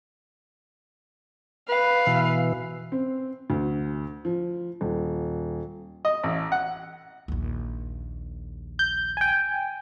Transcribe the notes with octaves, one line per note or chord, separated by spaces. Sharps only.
B4 F5
B2 E3
C4
D2
F3
D#1
D#5
A1
F#5
A#1 D#2
G6
G5 G#5